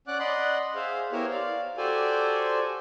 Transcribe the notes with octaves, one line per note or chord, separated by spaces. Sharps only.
C#4 D5 F#5 D6 F#6
D5 D#5 F#5 B5 C6
G#4 C5 E5 F5
B3 E4 G4 A#4 C5 C#5
D5 F5
F#4 G4 A4 C5 D5 G#5